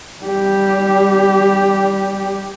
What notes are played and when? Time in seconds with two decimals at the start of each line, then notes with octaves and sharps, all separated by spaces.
0.25 G3 G4